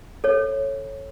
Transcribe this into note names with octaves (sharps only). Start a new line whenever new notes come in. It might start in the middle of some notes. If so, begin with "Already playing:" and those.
A4 C#5